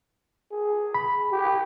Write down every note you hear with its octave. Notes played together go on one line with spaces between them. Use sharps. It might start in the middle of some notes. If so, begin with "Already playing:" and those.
G#4
B5
G4